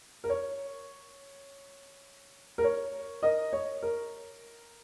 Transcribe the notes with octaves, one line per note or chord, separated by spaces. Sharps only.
A#4
C#5
A#4
C#5
A#4 D#5
C#5
A#4